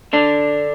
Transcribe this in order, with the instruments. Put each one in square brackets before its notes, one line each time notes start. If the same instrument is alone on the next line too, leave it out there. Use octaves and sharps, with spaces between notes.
[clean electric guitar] D3 D4